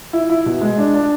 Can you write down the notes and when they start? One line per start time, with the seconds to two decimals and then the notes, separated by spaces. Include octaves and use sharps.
0.13 E4
0.30 E4
0.46 B2
0.61 G#3
0.78 D4
0.94 D4